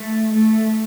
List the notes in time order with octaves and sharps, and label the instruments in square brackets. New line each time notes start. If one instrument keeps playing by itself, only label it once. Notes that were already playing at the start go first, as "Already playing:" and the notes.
Already playing: [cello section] A3
A3